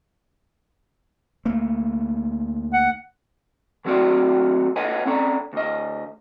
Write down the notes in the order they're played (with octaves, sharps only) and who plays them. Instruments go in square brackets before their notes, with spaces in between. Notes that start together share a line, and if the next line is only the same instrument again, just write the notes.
[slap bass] D2 A3 A#3
[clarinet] F#5
[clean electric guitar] D#3 F#3 A3 C4 F#4 D5
A4 B4 C#5 D#5 F#5 G#5
C4 C#4 A4 D5 A#5
D2 D#5